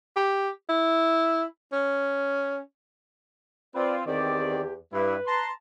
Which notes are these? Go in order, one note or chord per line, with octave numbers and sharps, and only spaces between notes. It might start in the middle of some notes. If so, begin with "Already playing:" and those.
G4
E4
C#4
C4 F4 B4 D5
E2 D#3 C4 G4 D5
G2 G3 E4 B4
A5 A#5 C6